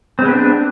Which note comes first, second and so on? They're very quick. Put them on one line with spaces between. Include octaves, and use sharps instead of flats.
C4 G#3 B3 G4 D4